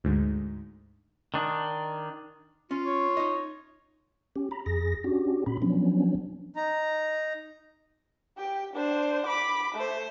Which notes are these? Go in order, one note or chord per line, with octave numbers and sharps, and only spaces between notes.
D2 G#2
D#3 D4
C#4 F4
C#5
D#4 D#5
C#4 G4
A#5 B5
F2 G#4 A#6
C#4 D4 F#4 G4
A#2 C#4 B5
F3 F#3 B3 C#4 D4
D#4 A#5
G4 G5
D4 C5
B5 D6
A3 C5